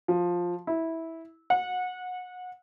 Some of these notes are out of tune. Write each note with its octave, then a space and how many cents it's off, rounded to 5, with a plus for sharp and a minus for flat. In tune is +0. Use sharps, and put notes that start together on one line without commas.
F3 +10
E4 -15
F#5 -25